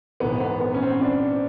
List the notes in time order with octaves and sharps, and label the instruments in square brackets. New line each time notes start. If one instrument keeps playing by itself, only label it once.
[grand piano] A#1 G#2 E3 [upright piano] B3
[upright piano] B3
B3
C#4
C4
D4